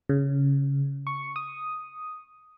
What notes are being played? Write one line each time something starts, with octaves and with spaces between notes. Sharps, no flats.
C#3
C#6
D#6